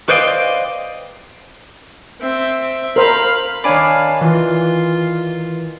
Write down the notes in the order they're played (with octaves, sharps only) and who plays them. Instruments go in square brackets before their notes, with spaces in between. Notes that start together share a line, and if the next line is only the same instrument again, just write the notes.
[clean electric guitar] B4 C5 D5 D#5 F5 G5
[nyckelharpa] C4 E5
[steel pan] A#4 C5 [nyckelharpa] F5 B5
[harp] D#3 D5 [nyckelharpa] D4 F5 [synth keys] C#5 G#5 B5
[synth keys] E3 [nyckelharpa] F4